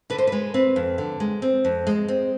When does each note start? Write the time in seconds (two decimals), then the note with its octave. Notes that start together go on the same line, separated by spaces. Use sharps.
0.10 D3 B4
0.18 C5
0.27 G#3 B4
0.54 C4 B4
0.76 F2
0.98 D3
1.20 G#3
1.42 C4
1.65 F2
1.87 G#3
2.08 C4